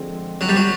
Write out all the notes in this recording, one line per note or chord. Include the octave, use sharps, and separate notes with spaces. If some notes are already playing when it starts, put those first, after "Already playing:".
Already playing: D3 F3 G#3 C4
F#3 G#3 C4 F4
G3
F#3